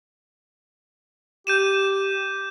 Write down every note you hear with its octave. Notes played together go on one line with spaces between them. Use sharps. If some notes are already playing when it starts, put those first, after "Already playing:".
G4 G6 D#7 E7